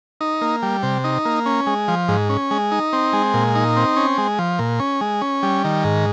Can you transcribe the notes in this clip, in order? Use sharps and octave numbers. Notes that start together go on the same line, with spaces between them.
D#4
A#3
G3
C3
D#4
A#3
C#4
G#3
F3
G#2
C#4
G#3
D#4
C4
G#3
A#2
D#4
C4
C#4
G#3
F3
A#2
C#4
G#3
C#4
G3
D#3
G#2